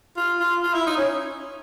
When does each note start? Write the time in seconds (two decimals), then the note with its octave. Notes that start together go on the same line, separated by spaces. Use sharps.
0.17 F4
0.40 F4
0.63 F4
0.74 E4
0.87 D#4
0.98 C#4